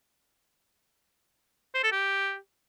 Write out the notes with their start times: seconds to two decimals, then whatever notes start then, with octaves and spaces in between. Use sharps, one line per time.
1.75 C5
1.83 A4
1.92 G4